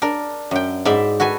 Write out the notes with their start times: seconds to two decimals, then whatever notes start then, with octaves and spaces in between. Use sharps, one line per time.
0.02 D4 A#4
0.51 F#2 G5
0.85 G#2 D5 E5 G5 B5
1.20 F#4 A4 B4 G#5